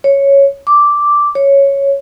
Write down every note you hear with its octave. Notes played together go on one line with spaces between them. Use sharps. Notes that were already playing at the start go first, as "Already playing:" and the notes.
C#5
D6
C#5